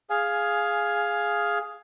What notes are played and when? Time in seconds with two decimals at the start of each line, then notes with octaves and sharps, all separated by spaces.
0.10 G#4 F5 G#5